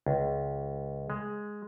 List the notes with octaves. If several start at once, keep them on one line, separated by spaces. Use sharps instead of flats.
C#2
G#3